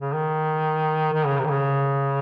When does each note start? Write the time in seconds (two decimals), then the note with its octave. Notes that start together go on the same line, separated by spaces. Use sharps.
0.01 C#3
0.13 D#3
1.13 D#3
1.26 C#3
1.38 C3
1.45 D#3
1.50 C#3